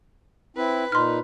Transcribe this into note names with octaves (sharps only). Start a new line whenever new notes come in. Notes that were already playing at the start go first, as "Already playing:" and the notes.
C4 E4 B4
A#2 D#4 C6 F6